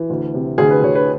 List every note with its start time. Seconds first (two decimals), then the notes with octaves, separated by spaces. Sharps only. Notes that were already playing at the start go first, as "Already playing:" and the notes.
Already playing: E3
0.10 D2
0.34 C3
0.58 D2 G#4
0.71 B4
0.82 D2 C#5
0.95 B4